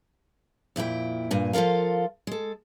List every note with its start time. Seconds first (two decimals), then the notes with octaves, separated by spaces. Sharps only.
0.76 F2 A#2 E4 G5
1.31 G2 A#2 G#5
1.53 F3 F4 A4 A#4 F5
2.27 G#3 A4